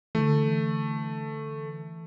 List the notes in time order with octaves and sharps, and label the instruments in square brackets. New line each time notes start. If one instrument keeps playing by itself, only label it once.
[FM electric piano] D3 E3 [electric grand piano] A3